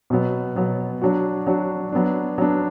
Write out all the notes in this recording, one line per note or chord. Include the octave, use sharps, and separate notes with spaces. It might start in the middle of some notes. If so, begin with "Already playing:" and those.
B2 F#3 B3
B2 F#3 B3
F#3 D4 F#4
F#3 D4 F#4
F#3 B3 D4
F#3 B3 D4